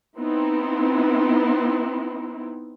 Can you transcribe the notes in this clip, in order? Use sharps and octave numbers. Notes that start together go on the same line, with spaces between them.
B3 C4 D#4 E4